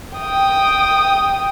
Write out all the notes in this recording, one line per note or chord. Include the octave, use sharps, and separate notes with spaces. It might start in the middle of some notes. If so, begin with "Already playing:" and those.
G5 D#6